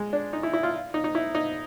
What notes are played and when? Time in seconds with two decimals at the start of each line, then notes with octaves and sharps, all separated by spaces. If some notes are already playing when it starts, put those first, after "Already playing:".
Already playing: G#3
0.13 D4
0.33 D#4
0.43 E4
0.54 E4
0.63 F4
0.94 D#4
1.04 D#4
1.15 E4
1.35 D#4